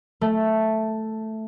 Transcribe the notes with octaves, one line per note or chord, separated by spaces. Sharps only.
A3